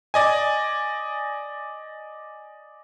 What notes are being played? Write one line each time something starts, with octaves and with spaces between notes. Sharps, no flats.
D5 D#5 G#5